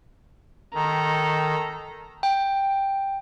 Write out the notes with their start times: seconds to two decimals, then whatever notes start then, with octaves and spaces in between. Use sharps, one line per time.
0.75 D#3 A4 A#5
2.23 G5